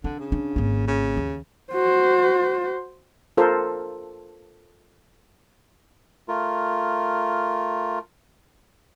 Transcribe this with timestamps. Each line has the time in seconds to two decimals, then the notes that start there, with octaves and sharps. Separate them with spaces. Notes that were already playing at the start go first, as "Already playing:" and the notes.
0.04 D3 D4
0.19 C#3
0.32 D4
0.56 G#1 A#3
0.87 C#3
1.17 D#2
1.73 F#4 C5
3.37 F4 A4 A#4 C5
6.28 A3 F4 A#4